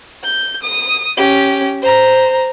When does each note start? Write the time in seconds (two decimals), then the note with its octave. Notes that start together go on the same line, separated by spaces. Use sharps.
0.24 G6
0.63 D#6
1.17 C#4 G4
1.82 C5 A#5